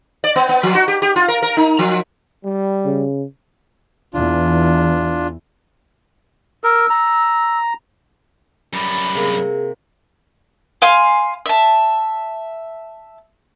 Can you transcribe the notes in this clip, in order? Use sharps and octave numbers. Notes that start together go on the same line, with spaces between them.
D5
B3
B3
F3
F#4
G4
G4
F4
A#4
A#4
D#4
F3
G3
C#3
E2 E3 D4 F4
A#4 E6
A#5
F#2 G3 B5
C3 A#3 G#4
F5 G#5 C6
E5 A5